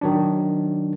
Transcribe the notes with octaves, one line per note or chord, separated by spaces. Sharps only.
D#3 F#3 D4